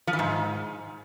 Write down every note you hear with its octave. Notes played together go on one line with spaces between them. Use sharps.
F3
E3
G#2